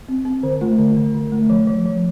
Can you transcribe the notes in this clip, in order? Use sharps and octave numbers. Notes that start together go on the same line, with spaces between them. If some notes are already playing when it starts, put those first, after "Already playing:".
C4
C4
D3 C5
A3 F4
D3
D3
D3
A3
F3
F3
F3